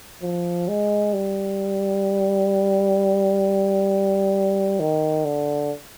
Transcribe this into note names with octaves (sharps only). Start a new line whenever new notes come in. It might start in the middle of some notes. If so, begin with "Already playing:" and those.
F3
G#3
G3
D#3
D3